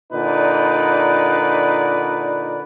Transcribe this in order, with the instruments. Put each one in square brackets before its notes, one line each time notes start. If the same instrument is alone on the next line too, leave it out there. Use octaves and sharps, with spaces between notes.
[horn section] A#2 D3 D#4 B4 D5